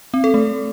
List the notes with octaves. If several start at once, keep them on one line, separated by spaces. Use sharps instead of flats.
C4
A4
A3